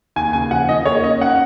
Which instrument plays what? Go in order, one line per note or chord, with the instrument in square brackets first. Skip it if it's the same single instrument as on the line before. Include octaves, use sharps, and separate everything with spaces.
[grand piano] D#2 [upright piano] G#5
[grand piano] C#3 [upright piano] G#5
[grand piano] F3 [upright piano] F#5
[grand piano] D#3 [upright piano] D#5
[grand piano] A#3 [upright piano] C#5
[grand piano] C#4 [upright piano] D#5
[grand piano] C#4 [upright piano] F#5